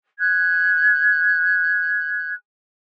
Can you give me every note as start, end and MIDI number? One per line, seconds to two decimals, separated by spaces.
0.19 2.33 90
0.19 2.33 92